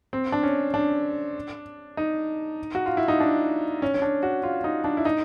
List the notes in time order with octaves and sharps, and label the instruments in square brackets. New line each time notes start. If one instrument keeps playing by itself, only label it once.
[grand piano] C4
D4
C#4
D4
D#4
F#4
F4
E4
D#4
D4
C#4
C#4
D4
F#4
F4
D#4
D4
E4
D#4